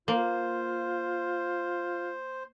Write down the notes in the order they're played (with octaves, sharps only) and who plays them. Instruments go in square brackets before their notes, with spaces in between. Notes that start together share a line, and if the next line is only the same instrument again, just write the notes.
[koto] A#3 [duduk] F4 [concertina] C5